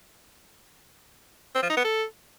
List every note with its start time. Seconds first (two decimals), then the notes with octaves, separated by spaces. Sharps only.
1.55 C4
1.62 F3
1.70 D#4
1.77 B3
1.84 A4